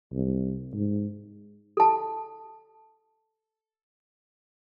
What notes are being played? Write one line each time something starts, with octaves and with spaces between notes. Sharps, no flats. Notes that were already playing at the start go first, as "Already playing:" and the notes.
C2
G#2
A4 A5